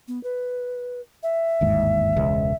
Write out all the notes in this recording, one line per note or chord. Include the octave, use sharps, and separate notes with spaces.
B3
B4
E5
G1 D#2 G#2
E1 C#2 G#3